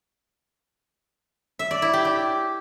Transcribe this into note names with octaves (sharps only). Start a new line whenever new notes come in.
E5
D5
E4
G4
G4